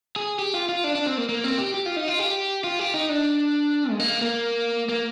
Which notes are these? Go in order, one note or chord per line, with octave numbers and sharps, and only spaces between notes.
G#4
G4
F4
F4
D4
D4
C4
A#3
A#3
C4
G4
G4
F4
D#4
F4
G4
F4
G4
D#4
D4
G#3
A#3
A#3
A#3